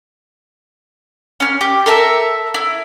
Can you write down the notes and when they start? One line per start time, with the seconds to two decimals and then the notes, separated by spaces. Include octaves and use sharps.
1.40 C#4 F6
1.61 G4
1.86 A4 A#4 E5 A5
2.54 E4